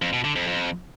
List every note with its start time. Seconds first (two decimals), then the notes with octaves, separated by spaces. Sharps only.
0.02 F2
0.13 B2
0.24 D3
0.36 F2
0.47 F2